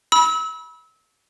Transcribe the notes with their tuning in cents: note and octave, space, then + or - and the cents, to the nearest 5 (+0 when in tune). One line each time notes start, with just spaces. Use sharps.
B5 -25 E6 -30